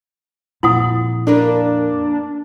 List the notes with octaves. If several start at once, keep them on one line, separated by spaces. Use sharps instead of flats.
F2 A#2 E4 F#5 D#6
A#3 D4 A#4 B4